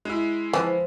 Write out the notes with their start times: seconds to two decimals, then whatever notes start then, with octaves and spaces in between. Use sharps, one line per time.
0.05 G#3 E4
0.53 E3 F3